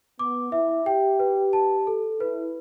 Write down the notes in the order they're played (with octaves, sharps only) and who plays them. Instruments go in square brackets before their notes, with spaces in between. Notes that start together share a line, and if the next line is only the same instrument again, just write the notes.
[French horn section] B3 [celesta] D6
[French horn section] E4 [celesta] E5
[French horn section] G4 [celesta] G5
[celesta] B4
A5
A4
[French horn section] E4 [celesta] B4